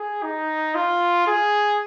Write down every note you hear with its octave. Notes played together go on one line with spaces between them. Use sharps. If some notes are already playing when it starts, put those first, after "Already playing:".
Already playing: G#4
D#4
F4
G#4